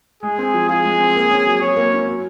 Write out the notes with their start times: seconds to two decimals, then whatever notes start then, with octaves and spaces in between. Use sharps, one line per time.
0.23 G#3 G#4
0.39 C4
0.54 F3
0.69 F4 G#4
0.85 G#3
1.00 C4
1.16 A#3
1.31 C#4
1.46 F#3
1.61 F#3 C#5
1.76 A#3
1.92 C#4
2.07 F#3